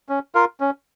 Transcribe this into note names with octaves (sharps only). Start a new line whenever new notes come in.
C#4
F4 A#4 F5
C#4